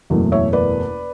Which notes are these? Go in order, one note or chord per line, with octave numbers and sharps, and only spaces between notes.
F#1 E2 B2 F#3 A3
C#5 E5
B4 D5